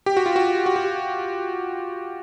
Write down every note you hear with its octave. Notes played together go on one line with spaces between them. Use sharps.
G4
F#4
F4
F#4
F#4
G4